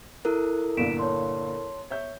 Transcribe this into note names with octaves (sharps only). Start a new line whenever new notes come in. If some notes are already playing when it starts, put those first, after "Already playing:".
E4 A4 A#4 F#6
G1 A#2 D3 B6 D7 E7
C#5 A5 C6
C#5 E5 G6